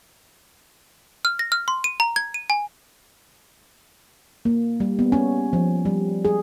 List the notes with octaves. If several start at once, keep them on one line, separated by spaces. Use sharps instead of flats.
F6
A#6
F6
C6
D#7
A#5
G#6
D#7
G#5
A#3
G3
B3
C#4
F3
G3
G#4